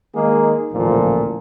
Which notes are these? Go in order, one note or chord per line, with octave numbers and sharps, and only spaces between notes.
D#3 G#3 A#3 D#4 G#4
A1 D2 A#2 F3